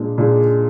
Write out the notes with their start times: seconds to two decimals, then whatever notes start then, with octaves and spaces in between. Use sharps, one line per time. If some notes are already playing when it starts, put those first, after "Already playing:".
Already playing: A#2 G#3 D4
0.18 A#2 G#3 D4 G#4